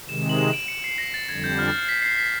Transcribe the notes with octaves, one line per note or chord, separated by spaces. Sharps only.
C3 D#3 G#3 E7
F#7
E7
D7
C#7
C7
A#6
A6
F2 D3 G3 G#6
G6
F6
A6
C7
B6
C7
B6